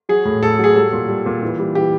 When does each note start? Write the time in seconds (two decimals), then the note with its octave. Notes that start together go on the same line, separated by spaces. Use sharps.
0.09 F#3 G#4
0.25 A2
0.43 A2 A4
0.59 F#3 G#4
0.76 G3 A4
0.93 A#2
1.08 G3
1.26 A#2
1.43 E3
1.59 G3
1.75 E3 G4